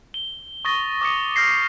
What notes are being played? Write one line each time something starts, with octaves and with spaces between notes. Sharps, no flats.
G7
C#6 D#6 A6 A#6 G7
D6 D#6 C#7
F6 G6 A#6 C7